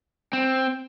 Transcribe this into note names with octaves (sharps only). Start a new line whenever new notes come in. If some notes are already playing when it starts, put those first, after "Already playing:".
C4